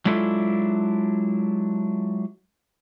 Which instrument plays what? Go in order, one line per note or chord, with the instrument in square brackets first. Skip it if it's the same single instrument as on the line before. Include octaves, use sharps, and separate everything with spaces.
[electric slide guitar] F#3 G#3 D4 E4 F4 A4